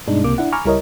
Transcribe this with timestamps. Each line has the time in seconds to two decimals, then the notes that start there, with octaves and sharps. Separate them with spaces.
0.07 G2 B2 G#3 D4 D#4
0.24 C#2 C3 A#3 D6
0.38 D4 E4 F#5
0.52 G#5 A#5 B5 C#6 D6 F6
0.65 C#2 G3 E4 A#4 C#5 D#5